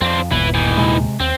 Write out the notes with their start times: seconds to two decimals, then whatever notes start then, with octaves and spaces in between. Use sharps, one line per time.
0.01 F2 C4 D4
0.31 G1 D#2 A#2 B3 E4 B4
0.54 E3 D#4
0.78 C3 G#3
1.20 D#2 C4